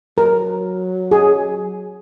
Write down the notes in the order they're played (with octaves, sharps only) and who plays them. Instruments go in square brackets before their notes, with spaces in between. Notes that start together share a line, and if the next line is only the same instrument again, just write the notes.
[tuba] F#3 [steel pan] A#4
[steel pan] G#4